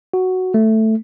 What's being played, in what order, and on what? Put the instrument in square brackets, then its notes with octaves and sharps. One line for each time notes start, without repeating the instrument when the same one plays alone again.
[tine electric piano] F#4
A3